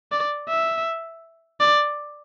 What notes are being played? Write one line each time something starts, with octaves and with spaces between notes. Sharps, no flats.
D5
E5
D5